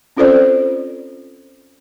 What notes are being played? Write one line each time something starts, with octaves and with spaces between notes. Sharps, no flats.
C4 C#4 F4 A4 C5 D5